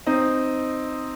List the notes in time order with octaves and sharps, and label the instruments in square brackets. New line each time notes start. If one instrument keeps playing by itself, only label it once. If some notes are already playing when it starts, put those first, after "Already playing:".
[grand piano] C4 D#4